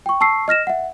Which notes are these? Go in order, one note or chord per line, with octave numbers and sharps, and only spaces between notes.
G5 C#6
A5 C#6 E6 C7
D#5 F6 A#6 E7
E5 F#5